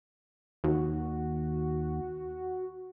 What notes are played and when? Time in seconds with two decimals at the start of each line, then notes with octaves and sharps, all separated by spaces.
0.64 D#2 F#4